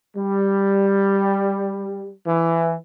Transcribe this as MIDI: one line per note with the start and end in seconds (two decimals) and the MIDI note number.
0.15 2.09 55
2.27 2.74 52